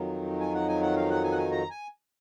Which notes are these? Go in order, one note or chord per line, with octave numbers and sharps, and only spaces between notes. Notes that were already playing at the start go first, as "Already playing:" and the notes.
Already playing: F2 D#3 F#3
G#5
F#5
G#5
F#5
F5
F#5
G#5
F#5
G#5
A#5
G#5